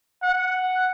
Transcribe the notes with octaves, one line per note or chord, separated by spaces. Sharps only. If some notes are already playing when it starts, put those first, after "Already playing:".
F#5